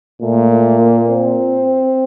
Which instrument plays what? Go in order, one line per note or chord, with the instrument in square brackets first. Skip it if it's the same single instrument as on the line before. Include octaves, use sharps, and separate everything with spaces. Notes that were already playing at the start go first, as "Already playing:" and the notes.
[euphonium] A#2 [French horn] A3
[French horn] A3
A#3
C4